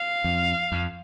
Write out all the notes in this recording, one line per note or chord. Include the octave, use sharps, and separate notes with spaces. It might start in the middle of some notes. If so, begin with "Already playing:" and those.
Already playing: F5
F2
F2